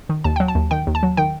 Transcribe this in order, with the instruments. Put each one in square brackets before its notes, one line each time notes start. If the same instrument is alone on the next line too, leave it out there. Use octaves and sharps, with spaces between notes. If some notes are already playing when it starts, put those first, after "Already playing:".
[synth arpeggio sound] D#3
D#2 A5
F#3 G5
A5
D#2
D#3 G5
D#2
A5
F#3
D#3 G5